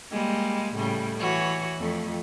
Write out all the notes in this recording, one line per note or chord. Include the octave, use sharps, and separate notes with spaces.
G3 G#3 A#3
A2 C#3 G3
E3 F#4 C#5
F2 A3